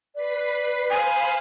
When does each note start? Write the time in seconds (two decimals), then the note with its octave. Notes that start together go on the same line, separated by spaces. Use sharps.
0.15 B4 D5 B6 C7
0.90 C5 F5 G#5 B5